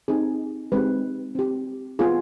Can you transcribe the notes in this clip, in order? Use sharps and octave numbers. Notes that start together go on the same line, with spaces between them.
C4 D#4 G4 G#4
G#3 C4 D#4 G4 B4
C4 G4
B3 F4 G#4